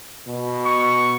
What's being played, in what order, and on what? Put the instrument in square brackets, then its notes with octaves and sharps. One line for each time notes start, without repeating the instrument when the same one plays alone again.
[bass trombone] B2
[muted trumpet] C#6